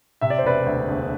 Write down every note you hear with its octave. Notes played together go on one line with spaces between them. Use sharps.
C3 E5
D5
C5
E1 B4 D5
D2
E1